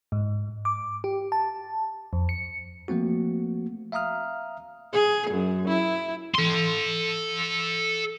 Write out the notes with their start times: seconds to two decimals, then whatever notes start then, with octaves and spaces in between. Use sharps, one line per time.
0.12 G#2
0.65 D6
1.04 G4
1.32 A5
2.13 F2
2.29 C#7
2.88 F3 A3 A#3 C4 F#4
3.92 E5 F5 A#5 D#6 F6
4.93 G#4
5.31 F#2
5.68 E4
6.34 A4 C6